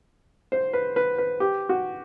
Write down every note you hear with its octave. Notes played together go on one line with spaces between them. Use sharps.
C5
B4
B4
B4
G4
F#4